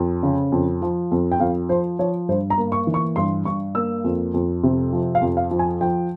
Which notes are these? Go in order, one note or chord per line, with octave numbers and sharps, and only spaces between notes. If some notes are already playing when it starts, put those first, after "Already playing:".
Already playing: F2
C#3
F2
F3
F2
G5
F2 F5
F3 C5
F3 C#5
G2 C5
A#5
A#3
C#6
E3
C#6
G2 C6
G2 C#6
A#3 E6
F2
F2
C3
F3
F5
F2
F5
F3
G#5
F3 G5